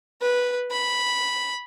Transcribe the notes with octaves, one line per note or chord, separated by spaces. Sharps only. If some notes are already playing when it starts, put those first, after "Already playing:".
B4
B5